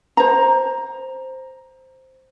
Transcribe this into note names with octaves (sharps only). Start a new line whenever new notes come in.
C5 A#5